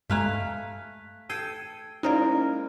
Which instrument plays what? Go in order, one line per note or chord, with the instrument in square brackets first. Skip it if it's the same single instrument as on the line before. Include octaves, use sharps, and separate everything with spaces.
[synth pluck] G2 G#3 A#5 [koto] A3 F5 G#5 [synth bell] F#6 B6
[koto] A4 G5 [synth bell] G#6 C7 D#7
[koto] G#3 A#3 A#4 [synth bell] C#4 E4 [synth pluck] D#4 C5 D5